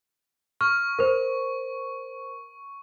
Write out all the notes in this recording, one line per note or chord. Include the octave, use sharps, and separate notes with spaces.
C#6 F6
A#4 C5